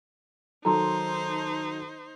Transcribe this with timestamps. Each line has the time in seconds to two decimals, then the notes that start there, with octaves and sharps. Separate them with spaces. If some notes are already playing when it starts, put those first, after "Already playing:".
0.65 D#3 F#3 D#4 A4 C5 A#5 C6